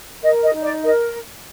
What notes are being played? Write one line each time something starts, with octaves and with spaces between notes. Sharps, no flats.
A#4 D#5
D#5
D#4
D5
A#4 D#5